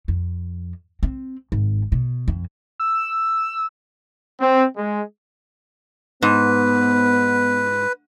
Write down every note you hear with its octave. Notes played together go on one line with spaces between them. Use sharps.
F2
C4
G#1
B2
F2
E6
C4
G#3
G#2 B3 B4